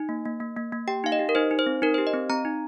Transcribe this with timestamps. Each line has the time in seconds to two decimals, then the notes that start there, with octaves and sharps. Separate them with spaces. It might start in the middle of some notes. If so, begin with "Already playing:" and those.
Already playing: D#4
0.09 A#3
0.25 A#3
0.40 A#3
0.57 A#3
0.73 A#3
0.88 G4 G5
1.04 D#4 F5
1.12 D#5
1.19 G4
1.29 A#4
1.35 D#4 C5
1.51 D#4
1.59 C5
1.66 C4
1.82 D#4 A#4
1.94 C5
1.98 G4
2.07 D#5
2.14 C4
2.30 C4 A#5
2.45 D#4